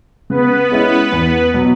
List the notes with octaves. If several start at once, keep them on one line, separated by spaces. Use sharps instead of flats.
C#3 B3 B4
G#3 C#4 E4
E2
B2 F#3